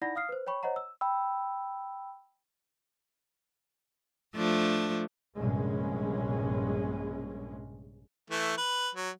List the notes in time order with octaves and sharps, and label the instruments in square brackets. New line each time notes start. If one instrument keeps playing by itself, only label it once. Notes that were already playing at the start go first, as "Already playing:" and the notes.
[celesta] D#4 E4 D5 F#5 B5 A#6
F5 D#6 F6 C7
B4 C5
C#5 G5 B5 C#6
C5 C#5 D#5 F#5 A#5
E6
[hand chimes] G5 B5 E6
[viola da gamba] F3 A3 D4
[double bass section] A#1 G2 C3 G#3 C#4
[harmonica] E3 A3
B4
F#3